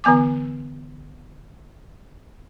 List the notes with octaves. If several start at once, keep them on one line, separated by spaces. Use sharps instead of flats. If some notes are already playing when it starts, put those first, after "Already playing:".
D3 E3 B3 G#5 D6